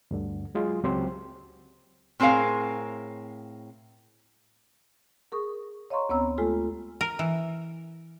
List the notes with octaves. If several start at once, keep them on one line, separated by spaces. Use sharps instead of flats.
D2 G2 D3
F#3 G#3 F4 G#4
C#2 F#3 C4 G4 C5
A2 C4 G#4 A#4 F5
G#4 A#4 C#6 D#6
C#5 D#5 F5 A#5 C6 C#6
D2 B3 C4 C#5 A#5 E6
G#3 A3 F4 G4 A4
A#4
E3